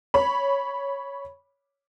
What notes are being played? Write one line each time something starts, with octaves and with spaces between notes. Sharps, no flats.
C#5 B5